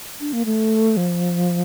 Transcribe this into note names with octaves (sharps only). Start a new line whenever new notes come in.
D4
A#3
A3
F3